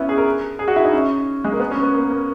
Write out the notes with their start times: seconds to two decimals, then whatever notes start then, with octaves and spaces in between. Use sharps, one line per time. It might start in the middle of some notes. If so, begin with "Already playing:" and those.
Already playing: B3 C#4 E4
0.09 G#4
0.18 A#4
0.59 G#4
0.68 F#4
0.76 E4
0.84 D#4
0.93 C#4
1.44 G#3
1.52 A#3
1.60 B3
1.71 C#4
1.83 B3
1.94 A#3
2.10 A#3